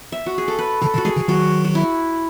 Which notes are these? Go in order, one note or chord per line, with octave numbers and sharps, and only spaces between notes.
E5
F#4
G#4
A4
B4
C#3 E3 A4
B2 D#3
F#4
E3 G#3 G#4
C#3 E3
D#3 F#3 F#4
F#4
E4